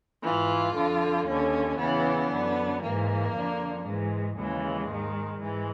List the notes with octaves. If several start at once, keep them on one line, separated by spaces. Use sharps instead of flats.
G#2 E3 F4
F2 D3
D#2 D3 C#4
E2 C#3 E3 B3
F#2 D3
G#2 E3 A#3
F2 D3
G#2 E3 G#3
D#2 C#3 E3 G#3
G#2 D#3
G#2 E3 G#3